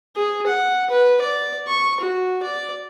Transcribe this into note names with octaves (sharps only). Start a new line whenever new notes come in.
G#4
F#5
B4
D5
C#6
F#4
D5